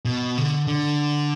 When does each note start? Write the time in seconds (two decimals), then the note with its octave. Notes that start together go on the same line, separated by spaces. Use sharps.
0.05 B2
0.37 D3
0.67 D3